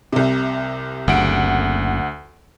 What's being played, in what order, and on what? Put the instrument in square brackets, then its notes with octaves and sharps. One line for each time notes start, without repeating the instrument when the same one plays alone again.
[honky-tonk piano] C2 C3
[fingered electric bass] F#1 [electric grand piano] D2 F#5 D7